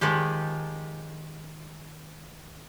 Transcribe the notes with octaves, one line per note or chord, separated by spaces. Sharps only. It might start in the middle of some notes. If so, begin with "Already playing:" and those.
D#3 F3 G#3 G4